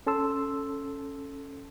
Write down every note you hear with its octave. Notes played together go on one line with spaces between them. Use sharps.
C#4 A4 A5 C6 E6